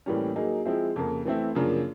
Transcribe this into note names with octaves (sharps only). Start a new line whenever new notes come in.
A2 E3 G3 A#3 C#4
F#3 A#3 D#4 G#4
F3 G#3 C4 E4 G#4
F2 C#3 F3 A#3
E3 A3 C4 E4
F#2 C#3 F3 A#3 D4